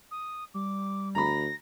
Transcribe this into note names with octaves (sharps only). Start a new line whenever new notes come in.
D#6
G3 D6
D2 A#5 B5 A#6